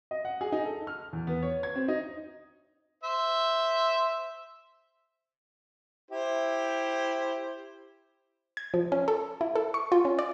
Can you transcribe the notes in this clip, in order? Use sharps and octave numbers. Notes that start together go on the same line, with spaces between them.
D#5
F#5
G#4
D#4
A4
F6
E2
B3
C#5
G#6
C4
D#4
C5 E5
E4 G4 C5
G#6
F3
C#4
A4
E4
A4
C#6
F4
C#4
D5